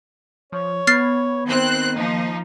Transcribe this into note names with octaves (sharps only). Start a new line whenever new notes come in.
F3 C#5
B3 B5 F6 G#6 A6 C7
D#3 C4 C5 F#6
F3 A#3 D#4